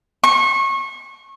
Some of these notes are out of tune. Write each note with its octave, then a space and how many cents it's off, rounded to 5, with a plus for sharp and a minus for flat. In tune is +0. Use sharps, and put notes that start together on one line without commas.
C#6 -30